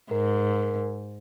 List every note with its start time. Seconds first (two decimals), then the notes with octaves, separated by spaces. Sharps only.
0.11 G#2 A#4